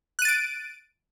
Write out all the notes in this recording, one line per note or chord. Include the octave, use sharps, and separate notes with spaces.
F#6 A6 D7 D#7